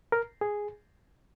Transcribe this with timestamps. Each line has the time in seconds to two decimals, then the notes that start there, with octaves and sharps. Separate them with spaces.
0.12 A#4
0.41 G#4